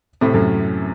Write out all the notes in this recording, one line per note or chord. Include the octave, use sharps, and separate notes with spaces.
A2 C3
F#2 A2